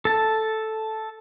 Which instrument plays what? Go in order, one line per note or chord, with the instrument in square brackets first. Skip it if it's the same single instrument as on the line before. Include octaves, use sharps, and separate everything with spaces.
[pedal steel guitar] A4 A5